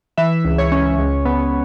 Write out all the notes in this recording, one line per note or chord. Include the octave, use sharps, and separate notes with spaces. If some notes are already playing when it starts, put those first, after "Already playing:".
E3 E5
C#2
C#5
C#4
C#2
B3